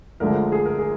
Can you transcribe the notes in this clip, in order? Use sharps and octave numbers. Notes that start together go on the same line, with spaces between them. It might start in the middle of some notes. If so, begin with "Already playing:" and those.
D2 D3 F3 G#3 A#4
G#4
A#4
G#4